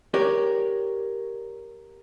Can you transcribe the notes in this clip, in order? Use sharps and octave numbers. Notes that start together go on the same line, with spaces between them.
G4 A#4 C#5 D5